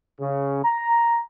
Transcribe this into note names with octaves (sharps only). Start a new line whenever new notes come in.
C#3
A#5